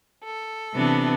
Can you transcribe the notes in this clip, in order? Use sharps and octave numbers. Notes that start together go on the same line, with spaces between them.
A4
C3 E3 B3 D4